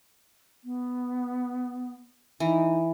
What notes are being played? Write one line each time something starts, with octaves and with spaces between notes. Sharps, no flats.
B3
E3 D#4